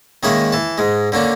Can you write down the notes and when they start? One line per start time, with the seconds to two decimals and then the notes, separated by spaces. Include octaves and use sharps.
0.23 D#3 G#3 A#3 C#4 E5 B5
0.52 E3 A5
0.78 G#2 G#3
1.12 D3 A#3 C#4 D4